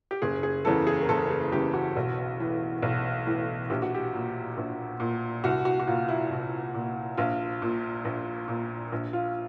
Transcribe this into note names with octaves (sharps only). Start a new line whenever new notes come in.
G4
F#1 G#4
G#4
E2 C#3 E3 A4
G#4
A#4
F#1 A4
G#4
E2 C#3 E3 G4
F#4
B1
A2 E3
B1
A2 E3
A#1 G4
F#4
G4
A#2
A#1
A#2
C2 F#4
F#4
F#4
A#2 F4
E4
C2
A#2
A#1 F4
A#2
A#1
A#2
A#1
F4